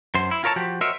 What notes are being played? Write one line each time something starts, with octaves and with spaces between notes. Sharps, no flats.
F#2 C5
E4
F4 A#4 C#5 A5
F3 F#4 G4
F#4 A#4 C5 C#5 D#5 E5